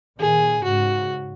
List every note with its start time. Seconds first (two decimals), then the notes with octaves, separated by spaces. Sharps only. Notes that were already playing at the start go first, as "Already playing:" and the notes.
0.19 A#2 D#3 G#4
0.64 G#2 C#3 F#4